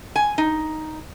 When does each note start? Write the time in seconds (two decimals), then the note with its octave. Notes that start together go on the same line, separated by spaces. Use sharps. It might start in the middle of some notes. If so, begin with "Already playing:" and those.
0.16 G#5
0.38 D#4